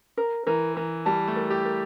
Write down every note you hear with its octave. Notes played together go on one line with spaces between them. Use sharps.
A#4
E3 A#4
E3 A#4
G3 A5
A3
A#4
G4
A#4